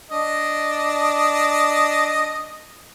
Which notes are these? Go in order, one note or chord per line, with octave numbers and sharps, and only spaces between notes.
D4 D#5